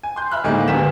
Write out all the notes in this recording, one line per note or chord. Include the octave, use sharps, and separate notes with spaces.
G#5
C6 G6
E5 B5 F6 F#6
D2 A2 D#3 G#3 A#3
G1 D2 G2 A#4 B6 E7